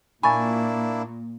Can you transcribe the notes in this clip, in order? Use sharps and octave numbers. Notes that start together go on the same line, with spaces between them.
A#2 A#3 D4 E4 G#5 B5 C#6 A6